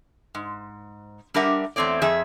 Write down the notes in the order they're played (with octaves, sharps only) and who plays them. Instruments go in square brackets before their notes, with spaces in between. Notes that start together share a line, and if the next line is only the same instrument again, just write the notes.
[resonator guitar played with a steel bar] G#2
G3 D4 G4 A#4 E5 F#5
E2 A3 C4 C#5 D5
F2 F3 G#4 E5